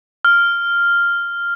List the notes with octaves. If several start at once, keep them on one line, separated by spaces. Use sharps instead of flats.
F6